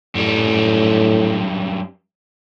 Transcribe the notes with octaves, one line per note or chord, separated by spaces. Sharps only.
F#2 A2 G3